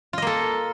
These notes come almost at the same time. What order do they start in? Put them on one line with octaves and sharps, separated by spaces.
F4 D#5 A#3 A4